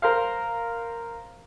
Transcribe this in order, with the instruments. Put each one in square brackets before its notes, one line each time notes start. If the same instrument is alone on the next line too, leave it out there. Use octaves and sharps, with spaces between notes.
[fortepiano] A#4 C5 F5